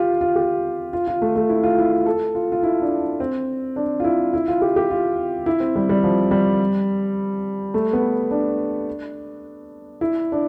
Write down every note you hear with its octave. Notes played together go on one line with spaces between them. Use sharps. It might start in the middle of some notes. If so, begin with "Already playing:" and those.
Already playing: F4 G4
F4
G4
F4
F4
A3
A3
E4
F4
E4
F4
A4
F4
F4
E4
D4
C4
D4
F4
E4
E4
F4
G4
G4
F4
E4
C4
G3
G3
F3
G3
A3
B3
D4
E4
D4